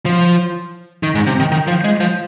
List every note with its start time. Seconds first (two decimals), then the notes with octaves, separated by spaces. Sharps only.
0.06 F3
1.03 D#3
1.15 G#2
1.27 C3
1.40 D#3
1.52 D#3
1.67 F3
1.84 G#3
2.00 F3